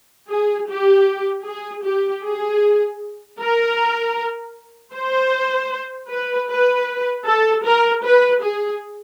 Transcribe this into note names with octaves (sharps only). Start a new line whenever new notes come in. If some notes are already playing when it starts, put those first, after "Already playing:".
G#4
G4
G#4
G4
G#4
A#4
C5
B4
B4
A4
A#4
B4
G#4